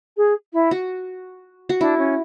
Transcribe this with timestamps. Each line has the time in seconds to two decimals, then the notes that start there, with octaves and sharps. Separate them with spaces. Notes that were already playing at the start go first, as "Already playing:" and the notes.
0.17 G#4
0.53 E4
0.71 F#4
1.69 F#4
1.80 D4 E4
1.98 C#4